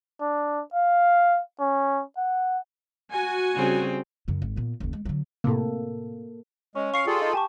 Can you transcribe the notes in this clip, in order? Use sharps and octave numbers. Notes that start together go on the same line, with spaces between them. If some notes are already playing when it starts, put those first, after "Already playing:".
D4
F5
C#4
F#5
F#4 G#5
C#3 G3 C4
F#2 C#3
G#1
A#2 B3
F#1 D#2
G#3
D3 F#3
A2 C3 A#3 A4
G#3 C#4 C#6
F5 C#6 C7 C#7
G3 F4 G#4 A4
D#4
G4 G#5 A5 C#6